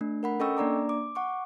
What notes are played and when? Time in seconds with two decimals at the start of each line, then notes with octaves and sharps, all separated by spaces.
0.01 A3 D4
0.23 A#4 F#5 B5
0.40 C#4 A4 D#5 G5 C#6 E6
0.57 A#3 D4 D5 A#5 D6
0.89 D6
1.15 F#5 C#6 D6